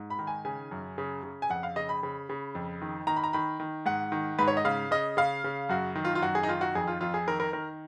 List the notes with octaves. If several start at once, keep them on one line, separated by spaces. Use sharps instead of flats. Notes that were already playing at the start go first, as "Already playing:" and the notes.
Already playing: G#2
B5
D#3
G#5
C#3 G#5
F#2
C#3
C#3
G#5
F2 F#5
F5
C#3 D#5
B5
C#3
C#3
F2
D#3
D#3 A#5
B5
A#5
D#3 B5
D#3
G#2 F#5
D#3
G#2 B4
C#5
D#5
C#3 F5
C#3 D#5
C#3 F5
C#3
F#2 F#4
D#3
F4
F4
F#2 F#4
G#4
D#4
D#3 F4
F#4
F2 G#4
F4
F2 F4
G#4
D#3 A#4
A#4
D#3 A#4